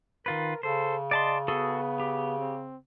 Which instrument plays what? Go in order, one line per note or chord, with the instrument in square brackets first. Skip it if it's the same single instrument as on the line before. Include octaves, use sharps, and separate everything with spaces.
[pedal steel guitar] D#3 F4 B4 [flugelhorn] A#4
[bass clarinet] C#3 [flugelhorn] A4 [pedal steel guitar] C5
[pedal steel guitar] D5 A5 C6 [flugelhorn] D#5
[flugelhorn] B3 [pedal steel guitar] F#4 G#4 A4
[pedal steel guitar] G4
[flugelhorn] C4